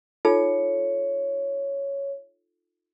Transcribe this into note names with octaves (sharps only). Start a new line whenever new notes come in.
D#4 F4 A4 C#5